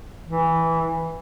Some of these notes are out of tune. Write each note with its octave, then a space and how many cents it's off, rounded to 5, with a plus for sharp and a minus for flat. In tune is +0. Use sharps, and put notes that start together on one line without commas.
E3 -5